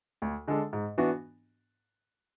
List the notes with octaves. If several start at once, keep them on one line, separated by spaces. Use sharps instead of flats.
D2
D3 G#3 D4 A4
G#2
E3 B3 D4 F#4